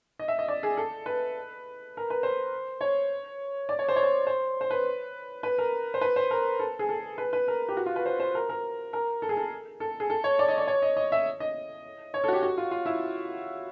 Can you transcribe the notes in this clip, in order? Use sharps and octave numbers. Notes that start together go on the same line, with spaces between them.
D#5
E5
D#5
D5
G#4
A4
B4
A#4
B4
C5
C#5
D5
C#5
C5
C#5
C5
C5
C5
B4
B4
A#4
C5
B4
C5
A#4
A4
G#4
A4
B4
B4
A#4
G4
F#4
F4
B4
C5
C5
A#4
A#4
A#4
A4
G#4
A4
A4
G#4
A4
C#5
D5
D#5
D5
C#5
D#5
D#5
E5
D#5
C#5
A4
F#4
G4
F#4
F4
F4
E4